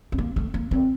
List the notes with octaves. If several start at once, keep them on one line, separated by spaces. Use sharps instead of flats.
C4
A#3
A3
A#3
C4